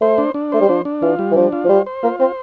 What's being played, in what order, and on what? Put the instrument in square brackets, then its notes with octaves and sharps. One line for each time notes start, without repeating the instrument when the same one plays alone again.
[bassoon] A3 [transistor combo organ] C5
[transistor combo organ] D4
D4
[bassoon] A3 [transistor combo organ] C5
[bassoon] G3
[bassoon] F3 [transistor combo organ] D4
[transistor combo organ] D4
[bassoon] E3 [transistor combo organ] F4
[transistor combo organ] G3
[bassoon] E3
[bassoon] F3 [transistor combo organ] D4
[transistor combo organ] F4
[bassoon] F3
[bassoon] G3 [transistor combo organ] C5
[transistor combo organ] C5
[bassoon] A#3 [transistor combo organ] F4
[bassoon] C4 [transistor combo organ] C5